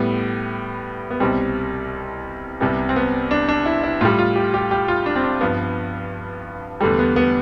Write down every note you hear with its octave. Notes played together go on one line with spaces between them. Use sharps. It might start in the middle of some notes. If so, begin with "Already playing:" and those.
Already playing: A2 G3 B3
B3
C2 B2 G3 C4
C2 C3 G3 B3
C4
B3
D4
D4
E4
E4
A2 G3 F4
F4
G4
G4
G4
F4
D4
C4
D4
G2 F3 B3
E2 D3 G3 A3
B3
B3